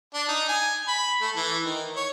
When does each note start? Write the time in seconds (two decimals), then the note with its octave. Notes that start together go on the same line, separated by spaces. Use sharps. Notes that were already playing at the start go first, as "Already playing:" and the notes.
0.14 D4
0.28 D#4
0.49 G#5
0.88 B5
1.22 A3
1.36 E3
1.65 D#3
1.96 C#5